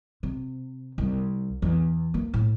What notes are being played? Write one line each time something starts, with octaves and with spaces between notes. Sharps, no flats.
C3
C2
E2
A#3
A2